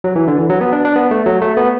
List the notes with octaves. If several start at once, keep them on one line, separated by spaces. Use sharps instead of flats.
F#3
E3
D3
E3
F#3
B3
D4
D4
B3
A3
F#3
A3
B3